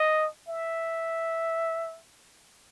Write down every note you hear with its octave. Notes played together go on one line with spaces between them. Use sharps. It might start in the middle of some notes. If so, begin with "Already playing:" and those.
Already playing: D#5
E5